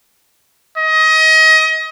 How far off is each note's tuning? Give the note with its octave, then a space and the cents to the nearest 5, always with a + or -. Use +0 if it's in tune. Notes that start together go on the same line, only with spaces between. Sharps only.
D#5 +25